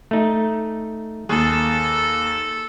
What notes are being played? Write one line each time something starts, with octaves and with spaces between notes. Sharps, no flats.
A3 D#4
D#2 G#4 A4